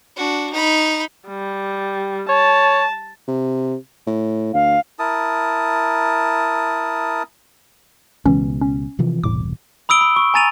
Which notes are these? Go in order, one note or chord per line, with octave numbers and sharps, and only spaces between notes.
D4 F#4
D#4 B5
G3
C#5 A5
C3
A2
D2 F5
E4 A#4 A5 D#6
C#2 B2 E3 C#4
C#4
C3 E3 F3
E1 C2 A2 D6
B5 D#6 E6 D7 G7
B5
C#6
G#5 A#5 A6 D#7 F7